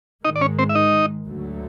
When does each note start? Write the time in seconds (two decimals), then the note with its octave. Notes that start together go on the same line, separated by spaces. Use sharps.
0.24 G#2 D#3 G#3 D#4 D#5
0.36 D5
0.41 C#4 C#5
0.59 C4 C5
0.69 E5
0.75 D#4 D#5
1.26 D2 D3 F#3 A3